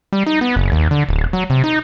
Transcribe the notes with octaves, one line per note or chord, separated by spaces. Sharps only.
G3
D#4
B3
F#1
D#2
D3
D1
F#3
C3
D#4